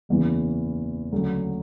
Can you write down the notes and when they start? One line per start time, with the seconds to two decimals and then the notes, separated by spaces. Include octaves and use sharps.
0.09 F#1 E2 C#3 E3
1.12 D2 C#3 F#3